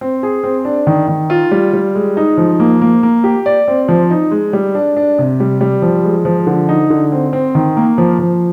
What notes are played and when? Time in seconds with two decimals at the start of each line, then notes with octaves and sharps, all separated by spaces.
0.01 C4
0.23 G#4
0.44 C4
0.65 D4
0.87 D#3
1.08 D#3
1.30 F4
1.51 G3
1.73 G3
1.95 G#3
2.17 D#4
2.37 F3
2.60 A#3
2.82 A#3
3.03 A#3
3.24 G4
3.46 D5
3.68 C4
3.89 F3
4.10 D#4
4.31 G#3
4.53 G3
4.75 D4
4.97 D4
5.19 C3
5.40 G3
5.61 G3
5.82 F3
6.04 G#3
6.25 F3
6.47 D3
6.69 D#4
6.90 D3
7.12 C4
7.33 C4
7.55 D#3
7.77 A#3
7.98 F3
8.19 F3